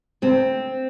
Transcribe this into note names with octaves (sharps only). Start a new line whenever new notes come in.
D2 C4